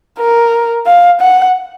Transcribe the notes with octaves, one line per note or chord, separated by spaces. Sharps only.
A#4
F5
F#5